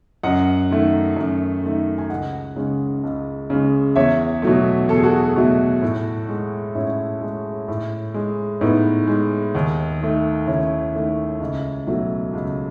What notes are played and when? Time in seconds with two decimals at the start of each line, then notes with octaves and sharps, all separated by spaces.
0.23 F#2 D#5 F#5
0.71 D#3 A3
1.16 F#2
1.64 D#3 A3
1.98 G#5
2.10 C#2 D#5 F#5
2.56 C#3 G#3
3.03 C#2
3.50 C#3 G#3
3.96 E2 C#5 E5
4.42 B2 F#3 A3
4.89 E2 A4
4.96 G#4
5.03 F#4 A4
5.36 B2 F#3 A3
5.82 A2
6.29 G#3
6.75 A2 C#4 E4
7.21 G#3
7.68 A2
8.14 G#3
8.61 A2 B3 D#4
9.08 G#3
9.55 D#2
10.01 D#3 A3
10.47 D#2 C#4 E4
10.93 D#3 A3
11.40 C#2
11.87 B2 F#3 A3
12.33 C#2